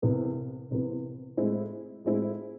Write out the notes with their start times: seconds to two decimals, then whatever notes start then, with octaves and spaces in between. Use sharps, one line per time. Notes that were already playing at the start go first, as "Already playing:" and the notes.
0.02 C2 C3 E3 B3
0.71 C2 C3 E3 B3
1.37 A2 G#3 C4 E4
2.04 A2 G#3 C4 E4